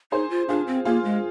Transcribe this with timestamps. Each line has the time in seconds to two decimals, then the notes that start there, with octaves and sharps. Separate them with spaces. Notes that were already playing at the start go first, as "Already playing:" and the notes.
0.12 D#4 G#4 C5
0.30 F4
0.49 D4 F4 G#4
0.67 C4
0.85 A#3 F4 G#4
1.04 G#3